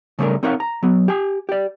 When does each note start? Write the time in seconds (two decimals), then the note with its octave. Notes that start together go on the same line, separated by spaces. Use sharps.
0.19 C#3 G3 A3 D4 A#4
0.43 C4 D#4 A#4 C#5 F5 F#5
0.60 A#5
0.83 F#3 B3
1.08 G4 G#5
1.49 G4 D5